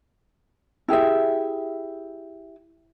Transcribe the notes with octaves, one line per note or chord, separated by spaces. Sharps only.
E4 G4 G#4 E5